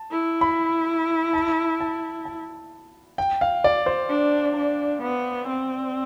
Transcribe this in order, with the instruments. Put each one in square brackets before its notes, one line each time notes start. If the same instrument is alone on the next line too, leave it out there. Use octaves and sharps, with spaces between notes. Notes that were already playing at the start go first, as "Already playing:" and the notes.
Already playing: [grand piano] A5
[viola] E4
[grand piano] B5
A5
A5
A5
G5
F5
D5
C5
[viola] D4
D4
B3
C4